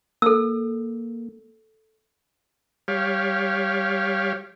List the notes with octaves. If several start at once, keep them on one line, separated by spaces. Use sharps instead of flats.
A#3 A4 E6
G3 G4 C#5 F5